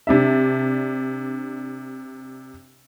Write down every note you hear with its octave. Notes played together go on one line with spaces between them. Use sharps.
C3 D4 E5